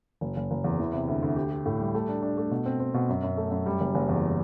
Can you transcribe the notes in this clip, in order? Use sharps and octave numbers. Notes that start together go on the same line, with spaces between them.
F#1
F#1
F#1
E2
E3
C3
D2
D2
G4
G4
A2
G3
A3
D4
D4
A3
B2
C4
C4
B2
F#2
F#2
A3
F#2
G3
F#1
F#1
E2